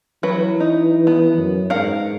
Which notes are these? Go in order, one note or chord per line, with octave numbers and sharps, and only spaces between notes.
E3 F#3 B4
D#4
B3
F#2
G#2 A#4 F5 F#5